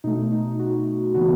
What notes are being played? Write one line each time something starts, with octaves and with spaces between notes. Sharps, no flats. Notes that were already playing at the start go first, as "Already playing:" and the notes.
B2 A3 D#4
D#4
F#4
C#3 E3 B3 F#4